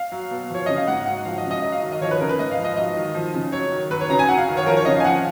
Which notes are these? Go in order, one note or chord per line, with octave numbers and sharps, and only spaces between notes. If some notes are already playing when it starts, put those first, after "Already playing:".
Already playing: F5
F#3
B2
F3 C#5
C#3 D#5
F5
G#2 F#5
F#3 F#5
F3 F5
D#5
C#3
D#5
F#3 D#5
F5
D#3
D#5
F3 C#5
B4
C#3 A#4
B4
G#2 D#5
F5
F3
D#5
F#3 D#5
D#3
F3
C#3
F#3 C#5
D#3
F#3 B4
C#5
C#3 A#5
G#5
F#3 F#5
F5
D#3
C#5
F3 A#4
C#5
C#3 D#5
F5
G#5
F3 F#5